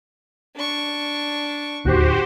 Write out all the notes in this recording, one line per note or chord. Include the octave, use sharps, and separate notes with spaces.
D4 C#6
D1 D#2 D#3 F#4 G4 C5